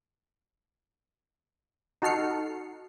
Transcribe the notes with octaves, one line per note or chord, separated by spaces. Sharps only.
D#4 F#4 A4 F6 C7 C#7